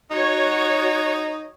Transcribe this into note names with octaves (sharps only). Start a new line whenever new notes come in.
D#4 F#4 C#5